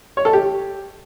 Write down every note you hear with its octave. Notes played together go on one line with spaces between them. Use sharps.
C#5
A4
G4